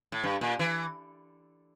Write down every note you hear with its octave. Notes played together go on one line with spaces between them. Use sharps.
A2
G2
A#2
E3